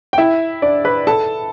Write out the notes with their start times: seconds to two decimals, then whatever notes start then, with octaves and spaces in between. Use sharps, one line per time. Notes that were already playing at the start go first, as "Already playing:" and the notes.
0.13 G5
0.18 E4 E5
0.62 D4 D5
0.85 B4 B5
1.07 A4 A5